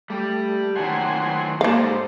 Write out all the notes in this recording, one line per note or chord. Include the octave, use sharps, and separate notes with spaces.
G3 A3 G4
D#3 F#3 A3 F#5 G#5 C6
G#2 G3 A#3 D#4 A4 C5 F5